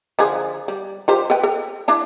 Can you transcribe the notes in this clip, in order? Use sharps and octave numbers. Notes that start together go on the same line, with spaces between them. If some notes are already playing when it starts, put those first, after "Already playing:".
D3 F3 G#4
G3
F4 G4 C5
A4 B4 G5
A4
D4 E4 A5